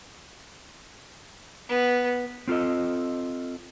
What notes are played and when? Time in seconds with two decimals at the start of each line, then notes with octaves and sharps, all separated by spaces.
1.69 B3
2.48 C4 F4 A4 D#5